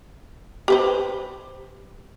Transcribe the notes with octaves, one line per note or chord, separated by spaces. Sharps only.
G4 B4 C5